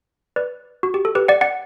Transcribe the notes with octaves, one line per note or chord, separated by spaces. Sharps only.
B4 D5
F#4
G4
A4
G4 B4
D5 F#5
D5 F#5